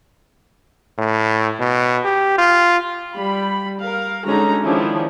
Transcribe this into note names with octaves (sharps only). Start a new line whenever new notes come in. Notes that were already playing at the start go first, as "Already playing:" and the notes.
A2
B2
G4
F4
G3 B5
A#4 F5
D3 G#3 C#4 D#4 F#4 A#5
D#3 F3 G#3 C#4 D4 E4